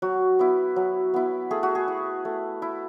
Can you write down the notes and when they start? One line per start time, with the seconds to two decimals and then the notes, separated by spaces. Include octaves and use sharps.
0.02 F#3 F#4
0.39 B3 E4
0.76 F#3
1.14 B3 E4
1.51 A3 G#4
1.63 F#4
1.75 G#4
1.88 E4
2.25 A3
2.62 E4